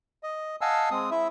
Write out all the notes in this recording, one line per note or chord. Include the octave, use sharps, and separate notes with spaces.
D#5
D#5 F5 F#5 G#5 A5 E6
G#3 C4 D#6
E4 E5